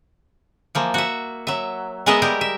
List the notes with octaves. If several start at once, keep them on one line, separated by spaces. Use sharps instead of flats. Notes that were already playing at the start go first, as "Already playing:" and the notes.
E3 F3 A#3
F#4 E5
F#3 E5
G#3 B3 G#4 A#4 D#5 E5
G3 G#3 G4 A#4
E5